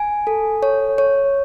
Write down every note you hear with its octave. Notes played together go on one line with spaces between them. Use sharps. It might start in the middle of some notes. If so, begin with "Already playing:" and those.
Already playing: G#5
A4
C#5
C#5